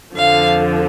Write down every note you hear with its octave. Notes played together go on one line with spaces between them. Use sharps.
F2 D3 F3 F5